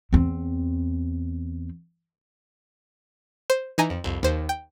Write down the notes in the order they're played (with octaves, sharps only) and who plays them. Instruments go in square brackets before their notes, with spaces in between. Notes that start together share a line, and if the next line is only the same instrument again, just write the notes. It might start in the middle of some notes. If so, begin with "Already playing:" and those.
[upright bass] E2 C4
[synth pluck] C5
E3 D#4 G#5 A#5
F2
C2 F2
D#2 C5
G5